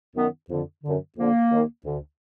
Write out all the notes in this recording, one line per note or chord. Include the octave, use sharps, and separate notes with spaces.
F#2 D#3 B3
F2 D3
F#2 D3
F2 D3 A#3
D#2 D#3
D2 D3